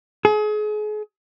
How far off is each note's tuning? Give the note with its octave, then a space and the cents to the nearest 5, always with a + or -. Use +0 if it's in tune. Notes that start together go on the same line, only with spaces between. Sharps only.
G#4 +35